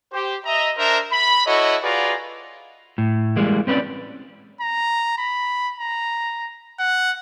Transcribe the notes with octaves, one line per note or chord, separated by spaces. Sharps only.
G4 C5
D#5 E5 A#5
D4 A#4 C5 E5 A#5
B5
E4 F#4 A4 C#5 D#5
F4 F#4 G#4 B4 D5 A#5
A2
E3 G3 G#3 A#3
C4 C#4 B4 C#5 D5
A#5
B5
A#5
F#5